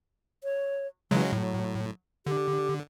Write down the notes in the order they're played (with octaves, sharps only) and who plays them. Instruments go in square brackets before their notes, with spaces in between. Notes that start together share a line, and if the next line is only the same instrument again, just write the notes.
[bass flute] C#5
[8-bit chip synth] C#3 F#3 G#3 [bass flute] E3
[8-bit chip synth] A2 [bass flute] F#3
[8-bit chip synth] D3 [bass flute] G4